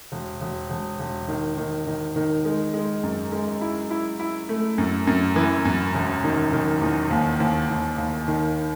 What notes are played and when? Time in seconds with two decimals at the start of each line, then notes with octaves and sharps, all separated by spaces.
0.12 E1
0.41 E1
0.70 E1
0.99 E1
1.28 D#3
1.57 D#3
1.87 D#3
2.16 D#3
2.45 G#3
2.74 G#3
3.03 F#2
3.32 G#3
3.61 E4
3.90 E4
4.20 E4
4.49 A3
4.78 F#2
5.07 F#2
5.36 E3
5.65 F#2
5.95 E1
6.24 D#3
6.53 D#3
6.81 E2
7.10 D#2
7.40 D#2
7.69 D#2
7.98 D#2
8.28 D#3